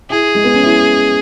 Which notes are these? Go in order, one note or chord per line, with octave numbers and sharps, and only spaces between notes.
E4 G#4
G#3
B3
C#4
E4